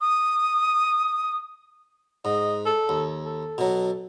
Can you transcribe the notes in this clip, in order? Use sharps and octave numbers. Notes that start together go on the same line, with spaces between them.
D#6
G#2 D#5
A4
D#2
A4
B2 F#3